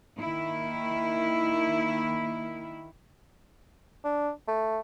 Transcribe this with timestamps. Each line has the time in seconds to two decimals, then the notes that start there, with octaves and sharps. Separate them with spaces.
0.19 D#3 A#3 E4
4.05 D4
4.48 A3